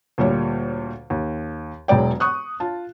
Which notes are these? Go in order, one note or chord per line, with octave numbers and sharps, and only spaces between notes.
D2 A#2 G3 C#5
D#2
E1 F#3 G#3 D5 G5
C#6 D#6 F#6
F4 A5